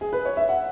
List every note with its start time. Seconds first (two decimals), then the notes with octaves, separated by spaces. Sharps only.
0.01 G#4
0.13 B4
0.25 C#5
0.37 E5
0.49 F#5